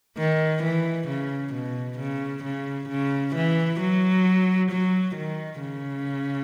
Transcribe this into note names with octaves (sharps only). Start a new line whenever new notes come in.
D#3
E3
C#3
B2
C#3
C#3
C#3
E3
F#3
F#3
D#3
C#3